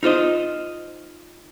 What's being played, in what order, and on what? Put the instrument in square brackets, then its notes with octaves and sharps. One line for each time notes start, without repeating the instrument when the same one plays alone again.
[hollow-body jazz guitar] D#4 F4 C5 D#5